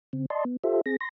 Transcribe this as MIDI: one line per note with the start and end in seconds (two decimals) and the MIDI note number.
0.13 0.26 49
0.13 0.26 60
0.30 0.44 74
0.30 0.44 75
0.30 0.44 81
0.30 0.44 84
0.45 0.56 59
0.64 0.81 65
0.64 0.81 67
0.64 0.81 69
0.64 0.81 72
0.64 0.81 76
0.86 0.96 60
0.86 0.96 68
0.86 0.96 94
1.01 1.09 84
1.01 1.09 94